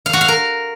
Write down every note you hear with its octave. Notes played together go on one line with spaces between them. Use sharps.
F5
F#4
F5
A#4